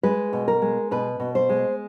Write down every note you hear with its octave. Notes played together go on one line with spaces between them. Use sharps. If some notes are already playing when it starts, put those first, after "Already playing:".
G#3 B4
B2
A#4
G#3
B2 B4
B2
C5
G#3